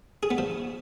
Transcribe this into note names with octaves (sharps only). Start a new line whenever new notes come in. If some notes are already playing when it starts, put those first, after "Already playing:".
G#4
B3
F3